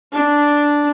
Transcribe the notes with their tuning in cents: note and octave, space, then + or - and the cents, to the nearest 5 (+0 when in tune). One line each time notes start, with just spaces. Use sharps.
D4 -5